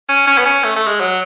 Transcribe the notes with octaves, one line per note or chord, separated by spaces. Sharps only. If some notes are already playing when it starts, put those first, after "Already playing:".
C#4
C#4
B3
C#4
A3
A3
G#3
F#3